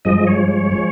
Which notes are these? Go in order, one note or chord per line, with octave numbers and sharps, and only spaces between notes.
G2 F3 G#3 D#5
C#5
C#5
F3 G#3